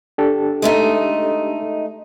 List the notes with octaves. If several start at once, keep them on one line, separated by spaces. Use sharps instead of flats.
D4 G4 A4
G#3 A3 D#4